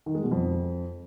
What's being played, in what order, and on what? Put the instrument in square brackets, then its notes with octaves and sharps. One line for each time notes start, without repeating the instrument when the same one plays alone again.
[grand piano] D#3
G#3
B2
F2